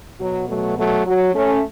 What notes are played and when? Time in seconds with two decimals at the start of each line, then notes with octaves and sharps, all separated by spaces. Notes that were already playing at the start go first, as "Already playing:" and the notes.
0.19 B2 F#3
0.48 F#3 A3
0.77 F#3 A3
1.06 F#3
1.34 A3 C#4